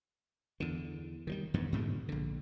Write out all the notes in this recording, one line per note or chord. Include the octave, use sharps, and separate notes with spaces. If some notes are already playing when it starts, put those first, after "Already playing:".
E2 D3
D#3 F3 G3
E2 G2 D#3 B3
G#2 B2 D3 G#3
A#1 D3